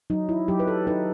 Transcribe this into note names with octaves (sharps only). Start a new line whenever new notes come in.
F#3 D#4
E4
F#3 G4
B4
A4
D#4 B4